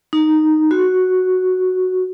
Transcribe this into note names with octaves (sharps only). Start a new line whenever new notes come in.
D#4
F#4